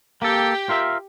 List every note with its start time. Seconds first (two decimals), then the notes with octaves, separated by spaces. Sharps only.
0.22 A#3 G4 A4 G5
0.69 F4 A#4 E5